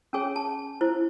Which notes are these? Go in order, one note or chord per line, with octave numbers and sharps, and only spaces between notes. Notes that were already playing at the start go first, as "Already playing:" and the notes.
C#4 G#4 C#5 G#5
A5
E4 C5